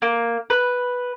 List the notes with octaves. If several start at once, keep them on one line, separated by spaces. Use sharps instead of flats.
A#3
B4